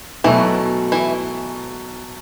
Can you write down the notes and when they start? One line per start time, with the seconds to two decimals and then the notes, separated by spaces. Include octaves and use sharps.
0.24 B2 E3 F#3 A3 E4
0.92 E3 E4